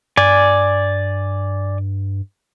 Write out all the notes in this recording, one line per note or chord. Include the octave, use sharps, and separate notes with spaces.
G2 D5 G#5